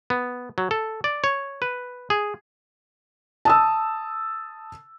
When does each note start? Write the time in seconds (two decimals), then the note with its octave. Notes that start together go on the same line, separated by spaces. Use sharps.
0.10 B3
0.58 F#3
0.71 A4
1.04 D5
1.24 C#5
1.62 B4
2.10 G#4
3.45 A5 D#6 E6